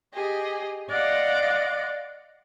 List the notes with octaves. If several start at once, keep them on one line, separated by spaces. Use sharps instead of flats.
G4 G#4 D#5
D5 D#5 F5 F#5 C6 D6